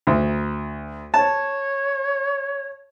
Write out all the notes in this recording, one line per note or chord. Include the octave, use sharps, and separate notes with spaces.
D2
C#5 A5